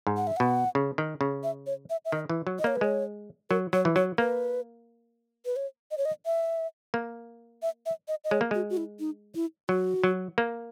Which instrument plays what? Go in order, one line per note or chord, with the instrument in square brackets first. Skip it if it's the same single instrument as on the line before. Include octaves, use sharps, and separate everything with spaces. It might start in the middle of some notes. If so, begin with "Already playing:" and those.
[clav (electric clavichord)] G#2
[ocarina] F#5
E5
[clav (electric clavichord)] B2 [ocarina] F#5
[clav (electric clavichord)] C#3
D#3
C#3
[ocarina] E5
C#5
E5
E5
[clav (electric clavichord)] D#3 [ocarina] D#5
[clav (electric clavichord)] E3
F#3
[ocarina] D#5
[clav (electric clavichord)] A#3 [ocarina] C#5
[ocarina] B4
[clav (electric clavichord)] G#3 [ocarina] C#5
[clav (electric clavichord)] F#3 [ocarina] A#4
[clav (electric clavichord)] F#3 [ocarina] C#5
[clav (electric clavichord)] E3
[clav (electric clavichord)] F#3 [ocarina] C#5
[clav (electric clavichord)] A#3 [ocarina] B4
[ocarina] B4
C#5
D#5
C#5
D#5
E5
[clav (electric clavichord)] A#3
[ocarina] E5
E5
D#5
D#5
[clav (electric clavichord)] G#3 [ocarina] C#5
[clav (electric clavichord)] A#3
[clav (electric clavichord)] G#3 [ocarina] F#4
[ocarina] F#4
E4
D#4
E4
[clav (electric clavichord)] F#3 [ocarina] F#4
[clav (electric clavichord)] F#3
A#3